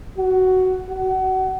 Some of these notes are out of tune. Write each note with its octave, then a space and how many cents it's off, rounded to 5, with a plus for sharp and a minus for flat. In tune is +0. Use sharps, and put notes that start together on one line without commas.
F#4 +10
F#4 +30